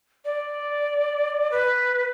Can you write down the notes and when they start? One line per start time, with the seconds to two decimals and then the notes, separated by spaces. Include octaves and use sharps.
0.25 D5
1.51 B4